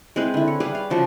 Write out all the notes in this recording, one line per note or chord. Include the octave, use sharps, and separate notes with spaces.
G#3 C4 E4 B4
D3 E4
C#5
G3 G#4 B4 F5
F5
C#3 F3 G3 F#4